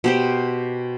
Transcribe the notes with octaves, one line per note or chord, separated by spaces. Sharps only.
B2 G4 C5